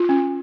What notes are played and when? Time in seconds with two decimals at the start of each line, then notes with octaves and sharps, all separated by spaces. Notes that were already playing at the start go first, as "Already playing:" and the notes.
Already playing: F4
0.09 C#4